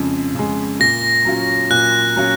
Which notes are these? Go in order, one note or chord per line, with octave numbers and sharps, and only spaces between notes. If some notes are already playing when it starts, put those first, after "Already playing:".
Already playing: F2 C#3 G#3
C#3 G#3
A#2 A#6
F#3 C#4 F4
A#2 F#6
F#3 C#4 F4